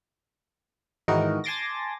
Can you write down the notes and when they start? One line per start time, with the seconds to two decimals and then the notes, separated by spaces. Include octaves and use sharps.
1.08 G#2 D#3 E3 D#4 F#4 A#4
1.44 G#5 A5 C6 D6 A6 A#6